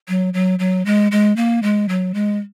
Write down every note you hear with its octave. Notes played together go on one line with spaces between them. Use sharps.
F#3
F#3
F#3
G#3
G#3
A#3
G#3
F#3
G#3